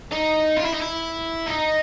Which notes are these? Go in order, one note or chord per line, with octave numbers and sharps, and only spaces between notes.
D#4
F4
E4
D#4
E4
D#4